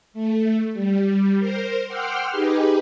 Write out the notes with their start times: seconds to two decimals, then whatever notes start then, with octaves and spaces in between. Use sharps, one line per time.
0.13 A3
0.74 G3
1.39 A#4 C5
1.88 F#5 G5 C6 D6 E6 F6
2.30 D#4 G4 G#4 B4